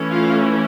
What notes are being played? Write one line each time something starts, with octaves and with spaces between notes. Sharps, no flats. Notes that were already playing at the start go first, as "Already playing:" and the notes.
Already playing: E3 A3 C#4
F4 F5